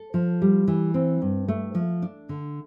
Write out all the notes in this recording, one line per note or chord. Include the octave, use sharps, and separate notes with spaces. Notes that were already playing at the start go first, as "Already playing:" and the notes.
Already playing: A4
F3
G3
E3
C4
G2
A3
F3
D4
D3